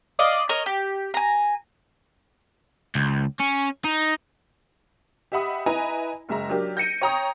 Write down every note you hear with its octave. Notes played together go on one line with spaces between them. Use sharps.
D5 D#5 F5
A#4 C#5 D#5
G4
G#5 A#5
C#2
C#4
D#4
G4 D#5 E5 F#5 B5 D#6
E4 B4 D#5 G#5 A#5 B5
F#1 G#3 E5 A#5
F#3 D4 G4 A#4
G6 A#6 C#7 D#7
C#5 G5 A#5 C#6 D#6